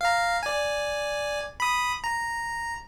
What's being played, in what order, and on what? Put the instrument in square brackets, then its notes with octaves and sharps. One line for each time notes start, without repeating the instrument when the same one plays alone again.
[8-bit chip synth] F5 A#5
D5 G#5
B5 D#6
A#5